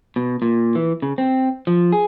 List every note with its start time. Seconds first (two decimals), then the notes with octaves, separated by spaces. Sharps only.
0.16 B2
0.42 A#2
0.75 E3
1.02 C#3
1.18 C4
1.67 F3
1.92 G#4